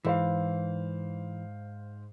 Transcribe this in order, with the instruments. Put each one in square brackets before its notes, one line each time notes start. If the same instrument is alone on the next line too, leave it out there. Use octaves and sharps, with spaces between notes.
[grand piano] G#2 C5 F5 [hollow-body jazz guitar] E3